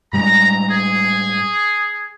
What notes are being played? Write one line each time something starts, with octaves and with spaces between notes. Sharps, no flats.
A2 G3 G#3 A#5
G#4